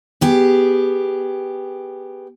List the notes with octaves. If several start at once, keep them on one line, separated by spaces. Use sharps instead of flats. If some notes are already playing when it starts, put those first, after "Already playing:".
B3 G4 G#4